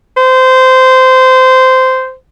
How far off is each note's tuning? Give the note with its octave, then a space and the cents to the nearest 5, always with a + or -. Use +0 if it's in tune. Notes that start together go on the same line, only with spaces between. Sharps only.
C5 -15